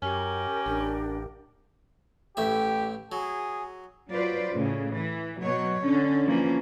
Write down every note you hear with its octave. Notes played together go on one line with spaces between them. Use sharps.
F#2 C#4 G4 A#4
A1 D4
A1 A2 G4 E5
F#3 G#4
F#3 F4 B4 C5 D5
A2 C#3
E3
B2 F#3 C#5
D3 C#4
E3 F3 A#3 C#4